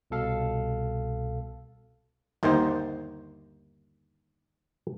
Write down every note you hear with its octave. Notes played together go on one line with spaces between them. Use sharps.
C2 B2 A4 F5
G1 D#2 D#3 D#4 C5